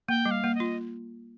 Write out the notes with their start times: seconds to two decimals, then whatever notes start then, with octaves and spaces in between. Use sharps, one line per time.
0.09 A#3 G5
0.26 G3
0.31 F5
0.44 A#3
0.55 D#5
0.60 F4